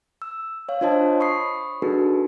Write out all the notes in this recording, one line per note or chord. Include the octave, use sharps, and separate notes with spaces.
E6
C#5 F5
D4 F4 C5 C#5 D#5 A5
B5 C#6 D#6 C7
D4 D#4 F#4 G#4 A4 B4